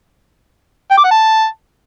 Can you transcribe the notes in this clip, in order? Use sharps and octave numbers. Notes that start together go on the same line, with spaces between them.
G5
D6
F#5
A5